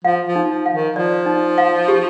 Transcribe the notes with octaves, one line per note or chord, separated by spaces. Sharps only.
F3 F5
F3
D#4
F3
F5
D#3
F3 D5
D#4
F5
G4